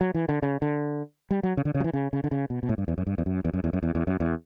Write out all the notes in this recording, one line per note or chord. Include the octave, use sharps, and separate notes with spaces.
F#3
E3
D3
C#3
D3
G3
F#3
C#3
D3
C#3
F#3
E3
C#3
C#3
D3
C#3
B2
B2
A2
G2
E2
F#2
G2
E2
F#2
E2
F#2
E2
F#2
E2
E2
F#2
E2